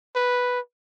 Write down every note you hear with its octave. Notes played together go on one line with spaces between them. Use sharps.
B4